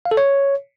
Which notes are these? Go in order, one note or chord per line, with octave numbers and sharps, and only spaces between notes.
F5
A4
C#5